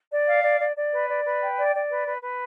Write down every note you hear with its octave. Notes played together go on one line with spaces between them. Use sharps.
D5
F5
D5
D5
D5
B4
D5
B4
G5
D5
D5
B4
B4
B4